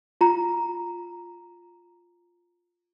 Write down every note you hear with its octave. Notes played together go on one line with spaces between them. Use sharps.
F4 A#5